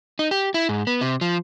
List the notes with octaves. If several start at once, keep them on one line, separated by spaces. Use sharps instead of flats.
D#4
G4
E4
G#2
B3
C3
F3